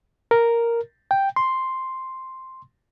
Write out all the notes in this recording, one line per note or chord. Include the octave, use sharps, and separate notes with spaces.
A#4
G5
C6